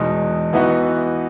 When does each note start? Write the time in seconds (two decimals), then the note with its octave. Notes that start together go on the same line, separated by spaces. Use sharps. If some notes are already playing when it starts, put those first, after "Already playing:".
Already playing: E2 B2 G#3 D#4
0.53 E3 B3 D#4 F#4